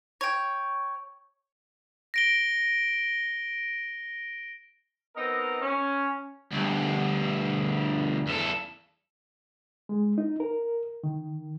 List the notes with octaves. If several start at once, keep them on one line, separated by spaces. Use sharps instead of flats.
C#5 G5
A#6 D7 G7
B3 C4 D#4 A#4 D#5
C#4
D2 G2
E2 A4
G#3
D#4
A#4
D#3